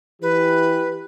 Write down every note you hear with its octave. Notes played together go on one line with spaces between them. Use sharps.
E3 G4 B4